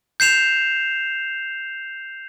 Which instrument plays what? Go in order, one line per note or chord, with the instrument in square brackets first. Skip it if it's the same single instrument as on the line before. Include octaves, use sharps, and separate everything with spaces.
[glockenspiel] G6 C7 E7 F7